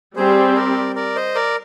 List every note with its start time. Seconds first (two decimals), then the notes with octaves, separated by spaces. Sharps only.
0.16 G3 C4 G4 G#4 C5
0.56 A#4 D5
0.95 A#4 D5
1.16 C5 D#5
1.35 A#4 D5